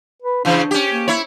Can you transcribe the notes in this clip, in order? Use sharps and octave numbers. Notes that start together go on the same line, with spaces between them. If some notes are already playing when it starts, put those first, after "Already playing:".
B4
C#3 E3 D4
C#4 G4
A#3
E4 C#5